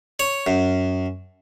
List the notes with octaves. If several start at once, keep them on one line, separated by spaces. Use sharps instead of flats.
C#5
F#2